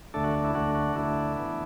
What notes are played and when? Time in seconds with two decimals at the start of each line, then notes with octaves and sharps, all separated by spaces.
0.14 D2 D3 A3 D4 A4
0.24 F#4
0.45 E4
0.55 D2 D3 A3 D4 F#4
0.75 F#4
0.95 D2 D3 A3 D4 E4
1.36 A2 E3 B3 D4